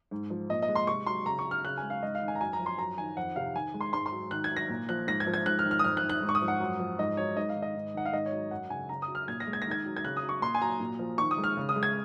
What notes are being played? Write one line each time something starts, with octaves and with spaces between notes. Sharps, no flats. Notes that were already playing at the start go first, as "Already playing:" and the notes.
G#2
F3
A#2 D#5
D#5
G#3
C6
C3 C#6
F#3 C6
C#3 A#5
C#6
F#3
F6
C#3 F#6
G#5
G#3
F5
G#2 D#5
F5
D#3
G#5
A#5
F#2 G#5
A#5
F3
C6
F#2 A#5
D#3 G#5
F2 F#5
C3 F5
D#3 G#5
G#3
C6
G#2 C6
C6
F#3
D#3 F#6
G#6
F#3
A#6
A#2
F3 F#6
G#2 A#6
G#6
F3
G#6
G#2 F#6
F6
D#3
F6
D#6
F2 F6
F#6
D#3
F#6
G#2
C#6
D#6
F3
F#5
F#2
F3
G#2 D#5
F#3 C#5
G#2 D#5
F5
D#3
D#5
G#2
D#3 F#5
F5
G#2 D#5
C#5
F#3
F#2 F#5
C#3 G#5
C#3 A#5
D#6
F#3
F6
A#2 G#6
A#6
G#3
G#6
D#3 A#6
G#6
F#3
G#6
C#3 F#6
D#6
F#3
C#6
A#2 C6
G#5
F#3 A#5
A#2
F3
D#3 C#6
D#6
G#3
F6
C#3
D#6
G#3
G#6